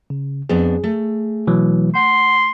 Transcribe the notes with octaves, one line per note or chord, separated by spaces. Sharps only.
C#3
F2 B3 D4 G#4
A3
B2 E3 F#3
F#5 C6